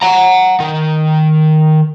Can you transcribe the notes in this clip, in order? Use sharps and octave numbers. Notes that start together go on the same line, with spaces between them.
F#5 A#5
D#3